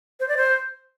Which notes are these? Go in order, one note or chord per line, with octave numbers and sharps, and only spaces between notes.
C5
D5
C5